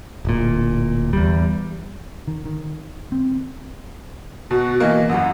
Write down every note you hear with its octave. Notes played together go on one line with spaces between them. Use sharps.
D1 A#2
E2 G3
D#3
D#3
C4
B2 F#4
E3 A#3 D#5
G1 F#2 F#5